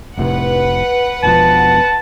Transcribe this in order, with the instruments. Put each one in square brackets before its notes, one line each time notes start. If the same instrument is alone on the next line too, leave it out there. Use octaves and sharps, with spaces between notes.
[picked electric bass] F1 A2 C3 [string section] B4 F#5
[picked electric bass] E1 B2 F3 [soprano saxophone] A5